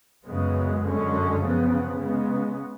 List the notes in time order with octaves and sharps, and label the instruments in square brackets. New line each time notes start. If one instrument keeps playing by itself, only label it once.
[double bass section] F#2 C#3 G#3 B3
F#2 D3 G#3 C#4
C#3 F3 B3
C#3 G#3 B3